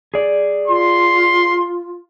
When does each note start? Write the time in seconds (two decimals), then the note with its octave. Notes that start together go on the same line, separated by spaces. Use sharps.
0.14 G#4 D5
0.68 F4 C6